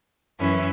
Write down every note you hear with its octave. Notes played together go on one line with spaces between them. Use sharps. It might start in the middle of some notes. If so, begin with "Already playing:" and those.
F#2 E3 C#4 E4